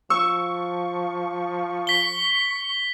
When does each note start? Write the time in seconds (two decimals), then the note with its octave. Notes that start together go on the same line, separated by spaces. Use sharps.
0.10 F3 C#6 E6
1.87 B6 G7